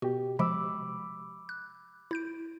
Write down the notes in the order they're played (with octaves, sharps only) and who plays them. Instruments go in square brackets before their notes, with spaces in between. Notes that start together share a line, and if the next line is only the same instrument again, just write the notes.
[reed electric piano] B2 G4 [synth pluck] F#4
[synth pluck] C3 F3 G#3 [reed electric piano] B5 D6 E6
[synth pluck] F#6
E4 G6 D7